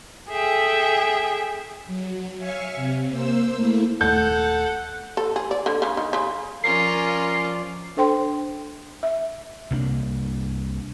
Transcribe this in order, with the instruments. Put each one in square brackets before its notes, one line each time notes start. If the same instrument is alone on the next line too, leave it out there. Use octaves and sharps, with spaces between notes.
[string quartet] G#4 A4 E5 G5
[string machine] F#3
C#5 E5 F5 G#5 C#6
C3
A#3 C5 E6
A3 A#3 E4
[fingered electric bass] D#1 A3 [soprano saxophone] A4 [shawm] F#5 [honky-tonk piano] G6
[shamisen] A4
G#4
D5
D3
C#3
D#3
C#3
[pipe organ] F3 D5 [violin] C#4 F4 [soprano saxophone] A#4 [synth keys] C7
[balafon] D4 A4 C5 G5 C6
E5
[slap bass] C2 C3 A#3 D4